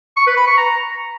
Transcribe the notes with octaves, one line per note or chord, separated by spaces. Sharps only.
C#6
B4
B5
C#6
A#5